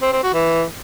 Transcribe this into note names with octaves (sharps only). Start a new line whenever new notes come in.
C4
C4
F#4
E3